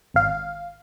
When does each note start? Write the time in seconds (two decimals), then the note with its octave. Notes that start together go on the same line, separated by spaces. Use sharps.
0.14 G#1 F5